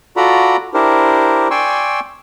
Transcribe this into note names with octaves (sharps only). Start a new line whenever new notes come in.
F4 F#4 A4 D5 A#5 B5
D4 E4 G4 A#4 C5
D5 G5 G#5 C6 C#6 E6